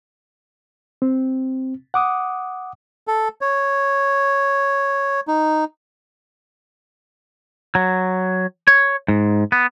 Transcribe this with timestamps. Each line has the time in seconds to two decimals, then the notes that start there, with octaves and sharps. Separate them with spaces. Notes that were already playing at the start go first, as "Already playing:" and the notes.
1.02 C4
1.94 F#5 D6 D#6
3.07 A4
3.41 C#5
5.28 D#4
7.75 F#3
8.68 C#5
9.08 G#2
9.52 B3